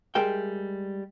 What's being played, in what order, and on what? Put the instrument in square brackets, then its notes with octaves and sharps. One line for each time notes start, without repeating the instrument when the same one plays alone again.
[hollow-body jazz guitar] G3 G#3 A#4 E5 G5